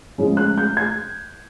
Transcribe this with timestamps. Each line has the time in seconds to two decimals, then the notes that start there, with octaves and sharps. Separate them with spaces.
0.18 C#3 F3 G#3
0.37 F#6
0.58 G6
0.77 G#6